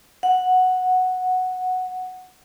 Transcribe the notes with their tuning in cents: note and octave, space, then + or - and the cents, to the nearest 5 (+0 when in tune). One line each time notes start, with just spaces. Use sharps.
F#5 -5